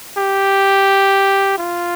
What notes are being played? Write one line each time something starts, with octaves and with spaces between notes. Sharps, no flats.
G4
F4